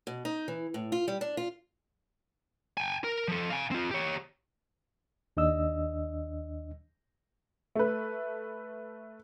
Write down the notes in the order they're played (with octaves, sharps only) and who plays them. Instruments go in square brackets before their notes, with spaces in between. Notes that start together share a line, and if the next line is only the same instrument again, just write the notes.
[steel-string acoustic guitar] B2
D#4
E3
A2
F4
G3
D4
F4
[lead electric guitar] G5 G#5
A#4
F3 A4
F5 G#5
C4 F4
G4 C#5
[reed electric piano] D#2 D4 D#5 E6
[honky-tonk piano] A3 B4